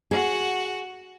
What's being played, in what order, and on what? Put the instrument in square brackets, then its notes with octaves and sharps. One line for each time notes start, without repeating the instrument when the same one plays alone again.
[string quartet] F#4 F#5 [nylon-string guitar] G#4